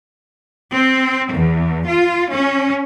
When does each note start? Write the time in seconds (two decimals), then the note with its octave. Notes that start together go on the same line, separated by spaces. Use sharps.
0.74 C4
1.34 E2
1.88 F4
2.33 C#4